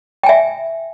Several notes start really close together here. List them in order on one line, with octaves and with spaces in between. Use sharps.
G5 G#5 E5